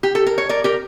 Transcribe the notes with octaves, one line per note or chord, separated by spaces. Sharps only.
G4
A4
A#4
C#5
A#4 D5
G4 A#4